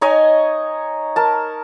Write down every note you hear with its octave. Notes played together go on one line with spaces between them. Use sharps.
D#4 C#5 D#5 G#5
A#4 A5